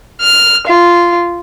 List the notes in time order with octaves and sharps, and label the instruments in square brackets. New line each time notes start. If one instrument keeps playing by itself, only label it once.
[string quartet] F6
F4